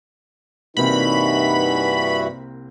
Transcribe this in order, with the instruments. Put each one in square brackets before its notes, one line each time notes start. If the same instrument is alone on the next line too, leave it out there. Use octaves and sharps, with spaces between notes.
[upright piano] C2 A#3 C4 [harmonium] G2 E3 F#4 [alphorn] D#4 [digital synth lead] B5